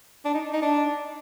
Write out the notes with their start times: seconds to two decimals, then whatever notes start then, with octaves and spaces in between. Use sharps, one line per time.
0.25 D4
0.34 D#4
0.53 D#4
0.62 D4